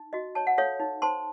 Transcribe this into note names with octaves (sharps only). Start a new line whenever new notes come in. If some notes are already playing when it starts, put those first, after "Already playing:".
Already playing: D#4
F#4 D#5
C#5 A5
F#5
A4 C#5 F5
D#4
C5 A5 C6